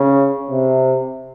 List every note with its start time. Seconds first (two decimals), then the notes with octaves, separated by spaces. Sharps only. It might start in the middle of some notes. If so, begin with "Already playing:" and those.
Already playing: C#3
0.50 C3